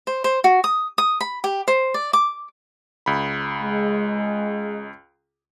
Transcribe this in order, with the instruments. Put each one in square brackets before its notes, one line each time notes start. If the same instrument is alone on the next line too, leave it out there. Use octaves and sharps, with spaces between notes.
[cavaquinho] C5
C5
F#4
D#6
D#6
B5
G4
C5
D5
D6
[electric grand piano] C#2 B5
[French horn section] G#3